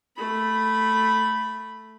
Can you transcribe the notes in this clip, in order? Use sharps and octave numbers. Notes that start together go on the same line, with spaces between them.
A3 B5